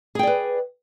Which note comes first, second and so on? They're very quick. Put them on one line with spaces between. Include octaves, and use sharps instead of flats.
G#4 G5 D5 B4